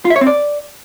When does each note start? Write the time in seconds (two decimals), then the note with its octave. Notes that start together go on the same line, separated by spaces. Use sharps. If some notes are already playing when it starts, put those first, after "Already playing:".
0.05 F4
0.10 E5
0.16 C#5
0.21 C4
0.27 D5